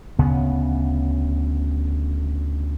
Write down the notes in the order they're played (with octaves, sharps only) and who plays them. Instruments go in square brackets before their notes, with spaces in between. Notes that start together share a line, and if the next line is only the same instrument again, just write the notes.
[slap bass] D2 C#3 B3